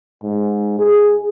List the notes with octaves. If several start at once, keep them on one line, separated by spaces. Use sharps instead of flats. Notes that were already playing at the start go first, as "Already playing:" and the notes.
G#2
G#4